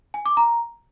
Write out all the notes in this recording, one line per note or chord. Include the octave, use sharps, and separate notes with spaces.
G#5
D6
A#5